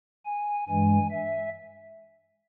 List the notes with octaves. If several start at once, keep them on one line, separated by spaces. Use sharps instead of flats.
G#5
G2 E3 G#3 G#5
E5